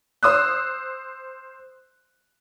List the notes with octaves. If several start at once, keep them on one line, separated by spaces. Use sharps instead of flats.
C5 D#6 E6 F#6